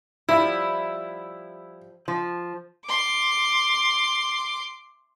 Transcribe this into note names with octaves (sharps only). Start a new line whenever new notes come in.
F3 G3 E4
F3
C6 D6